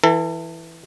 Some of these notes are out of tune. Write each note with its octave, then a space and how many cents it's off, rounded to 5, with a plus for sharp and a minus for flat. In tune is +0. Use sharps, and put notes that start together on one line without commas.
E3 +0 A4 +35